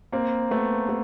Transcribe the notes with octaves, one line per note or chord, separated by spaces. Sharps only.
A#3 C4
A3 B3
A3 B3